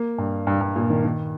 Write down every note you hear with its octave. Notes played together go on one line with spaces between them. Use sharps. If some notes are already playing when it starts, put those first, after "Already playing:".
Already playing: A#3
G2
G2
G2
A#2
D#3
D#3